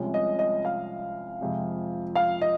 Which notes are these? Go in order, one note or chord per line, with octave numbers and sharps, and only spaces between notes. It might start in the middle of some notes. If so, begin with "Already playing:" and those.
Already playing: C2 C3 F3 G#3 C#4
D#5
D#5
F5
F2 C3 F3 G#3
F5
D#5